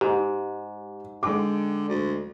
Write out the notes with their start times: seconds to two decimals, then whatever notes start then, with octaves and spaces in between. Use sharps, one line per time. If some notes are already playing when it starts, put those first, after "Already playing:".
0.01 G#2 G4
1.23 D3 G#3 G5 D6
1.89 D2